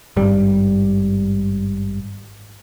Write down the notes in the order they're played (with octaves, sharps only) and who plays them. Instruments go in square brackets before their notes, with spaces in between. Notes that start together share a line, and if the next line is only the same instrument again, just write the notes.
[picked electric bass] G#1 G2 G3